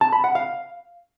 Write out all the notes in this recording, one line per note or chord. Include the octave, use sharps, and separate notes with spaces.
A5
B5
F#5
F5